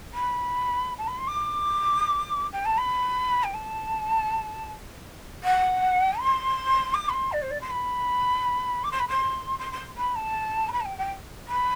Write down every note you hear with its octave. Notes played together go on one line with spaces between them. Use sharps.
B5
A5
B5
C6
D6
G5
A5
B5
G5
A5
F#5
C6
D6
B5
C6
D5
C5
D5
C6
B5
D6
C6
B5
C6
C6
C6
B5
A5
C6
B5
A5
G5
G5
B5